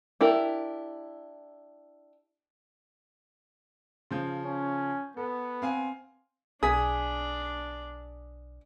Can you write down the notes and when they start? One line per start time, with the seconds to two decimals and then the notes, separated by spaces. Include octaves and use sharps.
0.21 D4 E4 G4 A#4
4.11 C#3 F3 G6
4.44 C#4
5.17 B3 A4
5.62 C4 F5 G#5
6.63 B1 D4 G#4 D#6 B6